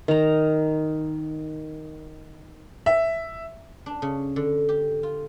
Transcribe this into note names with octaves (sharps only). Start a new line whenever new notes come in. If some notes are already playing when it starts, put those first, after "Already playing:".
D#3 A#5
E5
D4
C#3
D3
G4
F4